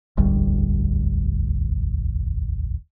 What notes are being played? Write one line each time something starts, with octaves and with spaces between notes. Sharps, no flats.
E1 A1 D2 G3